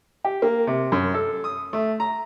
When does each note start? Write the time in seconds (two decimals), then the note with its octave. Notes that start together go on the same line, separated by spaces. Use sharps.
0.25 G4
0.42 A#3
0.67 C3
0.92 F#2
1.14 A4
1.44 D#6
1.73 A3
2.00 A#5